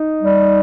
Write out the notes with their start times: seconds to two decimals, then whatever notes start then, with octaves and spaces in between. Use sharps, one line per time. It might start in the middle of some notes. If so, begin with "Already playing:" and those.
Already playing: D#4
0.22 G3